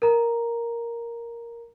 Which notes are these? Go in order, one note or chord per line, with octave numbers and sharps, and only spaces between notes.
A#4 A#5